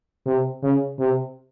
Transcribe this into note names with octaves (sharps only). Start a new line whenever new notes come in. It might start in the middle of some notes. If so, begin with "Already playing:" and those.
C3
C#3
C3